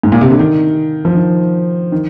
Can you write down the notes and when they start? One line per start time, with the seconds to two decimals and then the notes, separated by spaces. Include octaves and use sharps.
0.03 G#2
0.12 A#2
0.21 C3
0.30 D3
0.39 D#3
1.05 F3
1.15 D#3
1.92 D#3